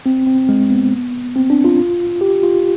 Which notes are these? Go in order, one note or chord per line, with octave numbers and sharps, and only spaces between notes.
C4
C4
G#3
B3
C4
D4
F4
G4
F4